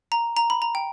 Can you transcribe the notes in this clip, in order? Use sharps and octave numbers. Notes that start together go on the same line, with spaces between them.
A#5
A#5
B5
A#5
G5